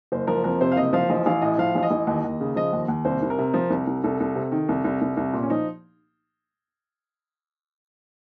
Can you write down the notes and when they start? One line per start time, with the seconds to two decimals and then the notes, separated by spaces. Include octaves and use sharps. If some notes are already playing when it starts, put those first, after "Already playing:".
0.12 F#1 C5
0.27 F3 A#4
0.44 F2 A#4
0.61 C3 C5
0.72 F5
0.76 F#1 D#5
0.93 F3 F5
1.10 A1 D#5
1.26 A1 F5
1.42 A2 D#5
1.58 F3 F5
1.75 A1 F5
1.83 D#5
1.91 A1
2.07 D#2
2.24 D#2
2.41 C#3
2.56 F3 D#5
2.73 D#2
2.88 D#2
3.05 C2 C5
3.22 C2
3.30 A#4
3.39 C3
3.54 F3
3.70 C2
3.87 C2
4.04 C2 A4
4.20 C2
4.36 C3
4.52 D#3
4.69 C2
4.84 C2
5.01 C2
5.17 C2
5.33 A#2
5.43 C#4
5.50 F3 D#4